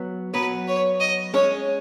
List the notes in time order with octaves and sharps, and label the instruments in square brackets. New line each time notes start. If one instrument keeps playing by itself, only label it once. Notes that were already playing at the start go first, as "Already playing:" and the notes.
Already playing: [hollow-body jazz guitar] F#3 B3
[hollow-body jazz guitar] F#3 B3 [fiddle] B4
[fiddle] C#5
D#5
[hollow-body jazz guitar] G#3 C#4 [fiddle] C#5